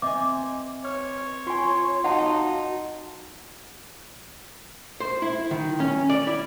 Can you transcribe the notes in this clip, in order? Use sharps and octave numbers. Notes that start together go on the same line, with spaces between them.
C4 D#5 E5 G#5 D6
C#5 F6
F4 G#5 C6
D#4 F#4 F5 F#5 A5 C6
C5
E4
D#3
C#4
D5
E4